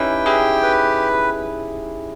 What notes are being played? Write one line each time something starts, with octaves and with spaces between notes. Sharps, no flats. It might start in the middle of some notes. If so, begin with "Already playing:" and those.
Already playing: C#4 D#4 E4 G4 B4 G5
E4 G4 G#4
B4